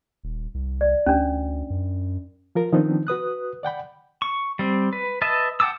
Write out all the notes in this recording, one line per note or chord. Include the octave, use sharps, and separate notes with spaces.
D#1
C2
D5
D2 C#4 D4
F#2
F3 F4 A#4
D#3 F3 B3 C4 D4 D#4
F#4 B4 D#6 F#6
D5 F#5 G5 B5
C#6
G3 C4
B4
B4 D#5 E5 A5
F#5 G5 A5 D6 E6